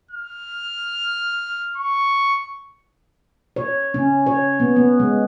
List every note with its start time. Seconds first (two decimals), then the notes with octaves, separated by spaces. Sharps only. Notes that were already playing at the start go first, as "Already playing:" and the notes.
0.11 F6
1.77 C#6
3.56 C#5
3.94 C#4
4.26 C#5
4.60 B3
4.76 B3
5.00 G#3